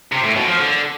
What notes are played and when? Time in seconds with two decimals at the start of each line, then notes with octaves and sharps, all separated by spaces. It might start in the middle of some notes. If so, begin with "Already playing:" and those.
0.12 C3
0.24 A2
0.36 B2
0.48 F3
0.60 D3